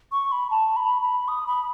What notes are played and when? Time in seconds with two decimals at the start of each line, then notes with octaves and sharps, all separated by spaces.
0.12 C#6
0.32 B5
0.51 A5
0.76 B5
1.02 B5
1.28 D#6
1.47 B5